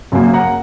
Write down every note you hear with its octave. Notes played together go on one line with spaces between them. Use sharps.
F#2 C#3 F#3 A#3
F#5 A#5